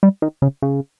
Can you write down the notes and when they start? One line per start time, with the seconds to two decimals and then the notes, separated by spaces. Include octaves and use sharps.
0.03 G3
0.22 D#3
0.42 C#3
0.62 C#3